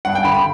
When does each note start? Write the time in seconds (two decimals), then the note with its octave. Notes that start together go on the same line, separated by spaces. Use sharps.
0.05 G2 F#5
0.15 G5
0.24 D3 B5
0.34 B5